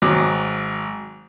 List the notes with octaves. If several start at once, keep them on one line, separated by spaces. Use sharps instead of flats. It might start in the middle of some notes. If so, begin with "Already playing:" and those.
G#1 F#3 D6 D#6